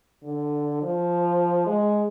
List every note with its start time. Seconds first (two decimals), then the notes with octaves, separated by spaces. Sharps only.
0.24 D3
0.83 F3
1.67 G#3